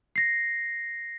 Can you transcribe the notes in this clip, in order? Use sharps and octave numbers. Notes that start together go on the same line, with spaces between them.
A#6 C7